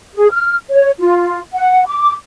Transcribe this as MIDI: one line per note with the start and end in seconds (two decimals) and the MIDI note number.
0.15 0.30 68
0.31 0.54 89
0.70 0.90 73
1.00 1.40 65
1.53 1.84 78
1.87 2.13 86